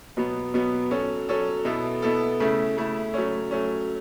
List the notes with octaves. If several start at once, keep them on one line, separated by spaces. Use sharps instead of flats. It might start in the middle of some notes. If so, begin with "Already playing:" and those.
B2 F#3 B3
B2 F#3 B3
F#3 C#4 A4
F#3 C#4 A4
B2 B3 E4 A4
B2 B3 E4 A4
C#3 A3 E4
C#3 A3 E4
F#3 A3 C#4
F#3 A3 C#4